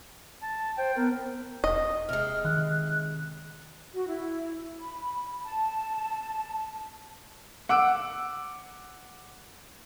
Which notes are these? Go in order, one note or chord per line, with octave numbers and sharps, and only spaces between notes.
A5
C5 G5
B3 A#4
E1 D#5
C3 G#3 F6
D#3 F#6
F#4
E4
B5
A5
F#5 D6 E6 D7